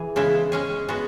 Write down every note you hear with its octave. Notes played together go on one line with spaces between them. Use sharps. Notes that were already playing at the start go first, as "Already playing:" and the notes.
Already playing: E3 G#4
C#3 G#3 B3 E4
G#3 C#4 G#4
G#3 B3 F#4